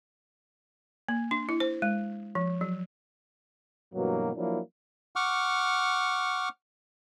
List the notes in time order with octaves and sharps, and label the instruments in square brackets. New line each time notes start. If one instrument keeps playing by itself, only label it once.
[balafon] A#3
D4
E4
C5
G#3
F3
F#3
[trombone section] G2 B2 E3 F#3 A#3
F3 F#3 A#3 D4 E4
[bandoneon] F#5 C#6 D6 F6